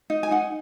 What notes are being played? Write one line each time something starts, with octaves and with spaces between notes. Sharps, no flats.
D#4
G#5
D#4 F#5